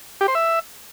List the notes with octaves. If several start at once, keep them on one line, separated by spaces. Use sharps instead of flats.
G4
C5
E5